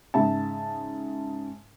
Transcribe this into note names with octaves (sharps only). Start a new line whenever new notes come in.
G#2 C#3 E5 A5